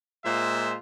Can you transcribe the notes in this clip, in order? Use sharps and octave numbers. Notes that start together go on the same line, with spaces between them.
A#2 G#3 F4 C5 E5